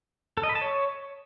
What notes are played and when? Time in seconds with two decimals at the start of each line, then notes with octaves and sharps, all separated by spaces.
0.37 A4
0.43 D#5
0.49 B5
0.55 A5
0.61 C#5